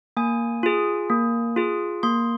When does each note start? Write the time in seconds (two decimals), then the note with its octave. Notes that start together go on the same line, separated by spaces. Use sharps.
0.17 A#3 G#5
0.63 F4 G#4
1.10 A#3
1.56 F4 G#4
2.03 A#3 C6